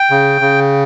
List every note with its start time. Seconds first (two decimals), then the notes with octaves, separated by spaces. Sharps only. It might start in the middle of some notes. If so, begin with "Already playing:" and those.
Already playing: G5
0.10 C#3
0.41 C#3